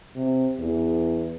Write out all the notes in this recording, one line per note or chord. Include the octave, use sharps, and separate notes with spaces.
C3
E2